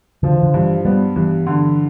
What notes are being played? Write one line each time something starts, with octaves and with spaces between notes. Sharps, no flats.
D3 F3
E3
D3
G2 E3
G3 B3
G2 E3
D3